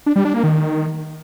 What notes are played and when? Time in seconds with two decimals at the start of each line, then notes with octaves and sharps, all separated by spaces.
0.06 D4
0.16 G3
0.25 D4
0.34 A#3
0.44 D#3